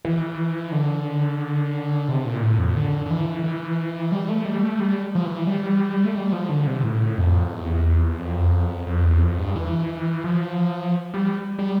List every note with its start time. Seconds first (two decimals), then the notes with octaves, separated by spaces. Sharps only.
0.05 E3
0.72 D3
2.08 C3
2.25 A#2
2.42 A2
2.58 F2
2.76 D3
3.05 D3
3.11 E3
3.44 E3
4.12 G3
4.29 A3
4.45 G3
4.63 A3
4.80 G3
5.15 F3
5.25 E3
5.47 G3
6.05 A3
6.15 G3
6.32 F3
6.49 D3
6.67 C3
6.83 A2
7.18 F2
7.52 E2
8.19 F2
8.87 F2
9.04 E2
9.22 F2
9.38 G2
9.56 E3
10.24 F3
11.14 G3
11.59 G3